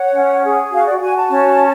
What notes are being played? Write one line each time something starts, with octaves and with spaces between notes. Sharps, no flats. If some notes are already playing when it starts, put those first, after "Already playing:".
Already playing: C#5 F#5
C#4
G#4
F#4 F5
D5
F#5
F#4 G#5
A5
C#4